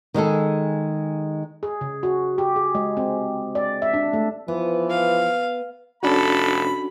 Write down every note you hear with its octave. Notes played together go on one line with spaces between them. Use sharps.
D#3 G#3 G#4 A4
G#4
C#3
F#4
G4
G#4
G#3
C4
D5
E5
D4
A3
E3 F3 B3
F5
F1 C#4 D4 F#4 A4 B5